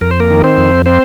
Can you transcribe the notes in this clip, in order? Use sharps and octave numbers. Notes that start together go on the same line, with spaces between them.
F2 A#4
C5
A#3 A#4
D#3
C4 C5
F2
C4 C5